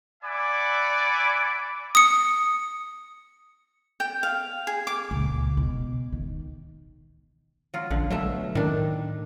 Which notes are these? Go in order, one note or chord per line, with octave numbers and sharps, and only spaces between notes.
D5 E5 F#5 G#5 B5 D6
D#6 C#7
G5
F5
G#4
D6
C#2 A#2
B2
D#3
F#3 F4
A#1 D3
B2 F#3 A3 E5
A2 D#3 D4